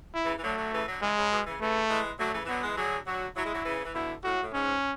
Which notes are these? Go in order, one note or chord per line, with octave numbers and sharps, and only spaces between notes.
E4
C#3 E3
E3
D3 F#3 A3
D3 F#3
C#3 E3
D3 F#3
C#3 E3 G#3
C#3
B2
C#3 E3
C#3 E3 A3
E3 G#3
D3 F#3 A3
C#3 E3
E3
D3 F#3 B3
E3 G#3
D3 F#3 G#4
D3 F#3 F#4
F#3 E4
G#3
D3 F#3
C#3 E3
E3
B2 D3 E4
A2 F#4
A2
G#2 C#4